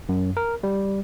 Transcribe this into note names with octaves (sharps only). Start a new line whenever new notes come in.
F#2
A#4
G3